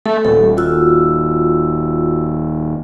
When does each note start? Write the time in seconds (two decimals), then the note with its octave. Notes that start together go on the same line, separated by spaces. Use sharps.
0.06 A3 A4
0.25 D#1 A4
0.57 F4 F#4 E6